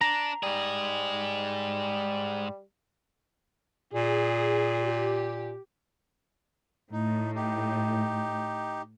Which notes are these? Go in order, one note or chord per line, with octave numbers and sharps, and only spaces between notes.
D4 A#5
G#2 G3 G#4
A#2 G#4
G4
A2 D#4
D#4 G4